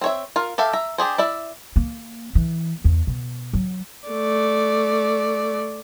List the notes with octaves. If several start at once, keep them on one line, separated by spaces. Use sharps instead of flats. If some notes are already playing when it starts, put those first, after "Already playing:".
C4 C#5 E5
F4 A#4
G4 A4 E5 F5
E5 A#5
D4 G4 G#4 C5
E4 D5 E5
A#3
E3
E2
B2
F#3
A3 D5